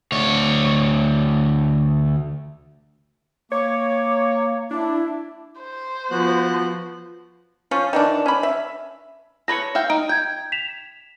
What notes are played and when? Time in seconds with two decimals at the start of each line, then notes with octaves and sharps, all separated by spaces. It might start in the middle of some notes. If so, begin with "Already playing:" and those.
0.12 D2 C#5
3.52 A#3 C#5 D6
4.71 D4 E4
5.59 C5
6.11 F3 B3 F#4 F#6
7.71 F3 C#4 F4
7.93 D#3 E3 D4
8.26 C#4 B5
8.43 E5
9.48 A4 B4 C#5 A#6 C#7
9.75 E5 F5 G5
9.90 D#4 D7
10.09 G5 G6 G#6
10.52 B6 E7 F7